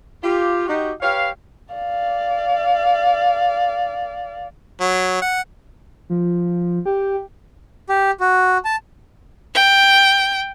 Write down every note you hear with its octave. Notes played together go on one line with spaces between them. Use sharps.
F4 G4
D#4 F#4 G4
G4 B4 C#5 F5
D5 F5
F#3
F#5
F3
G4
G4
F#4
A5
G5